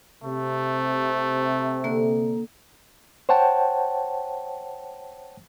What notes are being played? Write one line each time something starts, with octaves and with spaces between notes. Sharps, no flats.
C3 A3
D3 A#3
C5 C#5 F#5 G5 A5